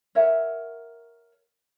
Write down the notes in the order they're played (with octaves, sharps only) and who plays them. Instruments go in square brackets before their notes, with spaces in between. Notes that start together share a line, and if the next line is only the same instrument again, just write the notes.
[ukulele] A#4 C#5 E5 F#5